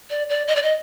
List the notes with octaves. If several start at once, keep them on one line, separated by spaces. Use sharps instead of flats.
D5
D5
D#5
D5
D#5